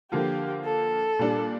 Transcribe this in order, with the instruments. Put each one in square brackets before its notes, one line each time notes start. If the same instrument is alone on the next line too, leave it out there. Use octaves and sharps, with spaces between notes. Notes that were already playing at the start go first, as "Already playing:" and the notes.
[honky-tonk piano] D3 F3 A#3 F4 [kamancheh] G4
[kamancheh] A4
[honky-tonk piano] A#2 G3 D4